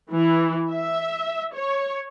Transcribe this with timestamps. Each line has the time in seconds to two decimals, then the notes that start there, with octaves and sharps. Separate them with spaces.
0.11 E3
0.70 E5
1.53 C#5